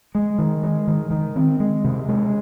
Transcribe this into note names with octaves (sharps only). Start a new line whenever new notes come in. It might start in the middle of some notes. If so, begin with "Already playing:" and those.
G#3
D#3
G#3
D#3
D#3
C4
G#3
C3
G#3